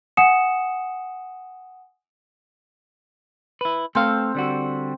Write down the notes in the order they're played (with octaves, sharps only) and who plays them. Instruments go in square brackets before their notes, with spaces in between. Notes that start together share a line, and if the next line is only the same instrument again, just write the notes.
[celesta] F#5 G#5 D#6 C#7 E7
[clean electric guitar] E4 B4
[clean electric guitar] A3 A4 F5 [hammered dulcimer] C4
[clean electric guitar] D3 G3 F#4